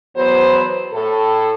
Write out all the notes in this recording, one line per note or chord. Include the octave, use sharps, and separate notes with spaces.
E2 F#3 B3 F#4 C5
A2 A4